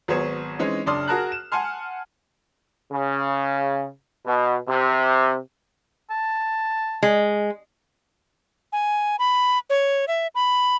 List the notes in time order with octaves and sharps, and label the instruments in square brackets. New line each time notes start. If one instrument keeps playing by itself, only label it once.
[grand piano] G#1 F#3 B3 G#4 C5 C#5
E3 G#3 C4 C#4 D#4
F#1 D4 D5 C6 D#6 F6
F#4 G#4 A#4 A5 A#5 F#6
E7
F#5 G#5 A5 C6 F6
[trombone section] C#3
B2
C3
[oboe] A5
[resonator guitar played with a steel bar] G#3
[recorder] G#5
B5
C#5
E5
B5